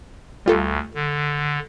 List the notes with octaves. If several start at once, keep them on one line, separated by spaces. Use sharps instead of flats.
D2 G3 F4 A4
D3